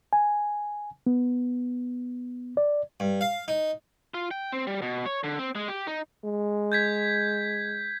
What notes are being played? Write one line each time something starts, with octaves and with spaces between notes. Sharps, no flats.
G#5
B3
D5
G2
F5
D#4
F4
G5
C4
G3
B2
C#5
D3
C4
G#3
G4
D#4
G#3
G6 G#6 B6